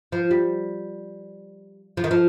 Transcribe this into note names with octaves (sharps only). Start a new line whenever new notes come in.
F3
G3
F3
D#3
F3